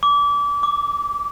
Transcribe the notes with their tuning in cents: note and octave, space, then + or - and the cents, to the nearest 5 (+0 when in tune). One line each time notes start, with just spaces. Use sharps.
D6 -30
D6 +0